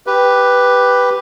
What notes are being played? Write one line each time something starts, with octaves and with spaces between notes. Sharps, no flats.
G4 B4